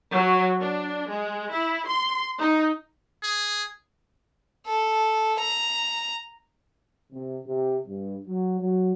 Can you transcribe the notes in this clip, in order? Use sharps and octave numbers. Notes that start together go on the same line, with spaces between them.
F#3
D4
G#3
E4
C6
D#4
G#4
A4
A#5
C3
C3
G2
F#3
F#3